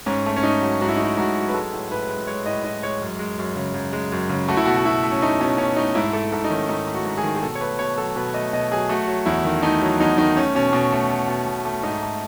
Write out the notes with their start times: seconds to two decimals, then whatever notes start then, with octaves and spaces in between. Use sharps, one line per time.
0.06 G#2 C#4
0.26 A3
0.36 C#4
0.43 G#2 D#4
0.62 F#3
0.81 G#2 F#4
0.88 E4
0.96 A3 D#4
1.04 E4
1.17 G#2 F#4
1.36 F#3
1.48 B4
1.53 G#3 A4
1.72 A2
1.91 A2 B4
2.09 G#3
2.27 G#3 C#5
2.46 A2 D#5
2.64 A2 D#5
2.83 G#3 C#5
3.02 F#2
3.19 G#3
3.39 F#2
3.56 C#3
3.74 F#2
3.93 G#3
4.12 F#2
4.29 C#3
4.48 A3 F#4
4.57 E4
4.65 B2 F#4
4.78 F#4
4.85 B2 E4
5.03 A3
5.12 C#4
5.22 A3 D#4
5.40 B2 C#4
5.58 B2 C#4
5.76 A3 D#4
5.95 G#2 E4
6.13 A3 A4
6.32 G#2 A4
6.44 D#4
6.50 D#3 C#4
6.69 G#2 D#4
6.87 A3
6.94 F#4
7.05 G#2
7.18 G#4
7.23 D#3
7.36 G#4
7.43 B2 A4
7.55 C#5
7.61 A3 B4
7.79 B2 C#5
7.98 F#3 A4
8.16 B2 B4
8.34 A3 D#5
8.53 B2 D#5
8.71 F#3 G#4
8.89 A3 F#4
9.07 F#3
9.26 E2 E4
9.44 D#3
9.62 A3 D#4
9.81 F#3
10.00 E2 D#4
10.18 D#3 D#4
10.37 A3 C#4
10.55 B2 C#4
10.73 B2
10.92 A3
11.11 A3
11.28 B2
11.46 B2
11.65 A3
11.83 G#2 D#4
12.03 A3